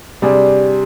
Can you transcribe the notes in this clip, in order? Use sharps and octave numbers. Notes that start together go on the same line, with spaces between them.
C3 G3 D4 G#4